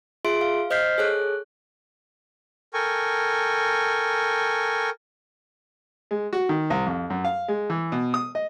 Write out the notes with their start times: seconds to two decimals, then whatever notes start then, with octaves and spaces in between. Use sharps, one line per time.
0.25 F4 G#4 E5 C6 D7
0.41 F5
0.70 C5 D#5 F6 G6 B6 C7
0.98 G#4 A4 C#5 F#6
2.74 A4 A#4 G5 G#5 C#6
6.11 G#3
6.33 F#4
6.49 D#3
6.70 C2
6.86 F2
7.10 F#2
7.25 F5
7.48 G#3
7.70 E3
7.92 B2
8.14 D#6
8.35 D#5